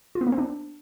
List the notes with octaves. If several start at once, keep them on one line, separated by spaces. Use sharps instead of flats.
F4
B3
A#3
C4
D4